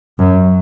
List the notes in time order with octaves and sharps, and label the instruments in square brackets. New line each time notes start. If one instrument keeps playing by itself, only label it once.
[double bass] F#2